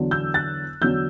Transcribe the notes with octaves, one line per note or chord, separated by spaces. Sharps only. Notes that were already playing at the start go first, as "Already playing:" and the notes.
Already playing: E2 D3 F#3
E6 G6
F#6 A6
E2 D3 F#3 E6 G6